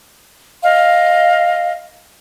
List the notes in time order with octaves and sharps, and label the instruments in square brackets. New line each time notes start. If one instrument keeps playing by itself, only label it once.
[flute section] D#5 F5